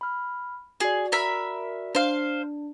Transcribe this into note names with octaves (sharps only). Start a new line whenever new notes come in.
B5 F6
F#4 G#4 D5
A#4 E5 B5
D4 C5 F5